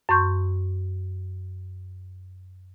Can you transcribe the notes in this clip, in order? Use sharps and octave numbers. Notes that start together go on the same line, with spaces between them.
F#2 C6 C#6 G6